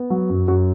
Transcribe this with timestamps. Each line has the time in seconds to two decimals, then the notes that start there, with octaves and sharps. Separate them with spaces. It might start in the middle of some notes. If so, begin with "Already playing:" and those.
Already playing: B3
0.10 F#3
0.30 F#2
0.48 F#2 F#4